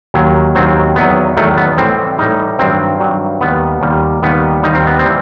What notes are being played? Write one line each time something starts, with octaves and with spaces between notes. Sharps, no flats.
D#2 D#3 F#3
D#2 D#3 F#3 C4
E2 D#3 F#3 B3
E2 D#3 F#3 A3
B3
A2 E3 G3 C4
A2 E3 G3 D#4
G2 D#3 F#3 C4
G2 D#3 F#3
D#2 D#3 G3 B3
D#2 D#3 G3
D#2 D#3 G3 B3
D#2 D#3 G3 D#4
C4
B3
C4
E3 G3